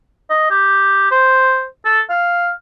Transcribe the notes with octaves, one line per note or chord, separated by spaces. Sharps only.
D#5
G4
C5
A4
F5